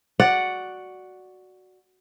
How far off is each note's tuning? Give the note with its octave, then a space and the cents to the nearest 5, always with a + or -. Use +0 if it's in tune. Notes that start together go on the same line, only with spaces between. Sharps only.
F#4 +0 D5 +0 F#5 +0